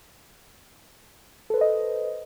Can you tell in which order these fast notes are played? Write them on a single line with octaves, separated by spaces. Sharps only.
A4 B4 C5 D#5